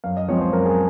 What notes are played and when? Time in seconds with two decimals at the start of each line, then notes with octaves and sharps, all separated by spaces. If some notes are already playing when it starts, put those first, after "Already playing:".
0.04 F#2 F5
0.17 D#5
0.28 F3 G#3 C4 C#5
0.41 C5
0.53 F#2 A#4
0.65 G#4